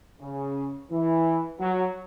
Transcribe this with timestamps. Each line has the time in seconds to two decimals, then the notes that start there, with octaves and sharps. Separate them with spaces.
0.21 C#3
0.91 E3
1.60 F#3